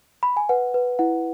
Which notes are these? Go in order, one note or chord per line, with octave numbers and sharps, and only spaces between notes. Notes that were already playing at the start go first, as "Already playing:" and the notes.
B5
G#5
B4 F#5
B4
E4 F#5